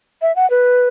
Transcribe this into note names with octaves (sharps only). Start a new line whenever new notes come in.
E5
F#5
B4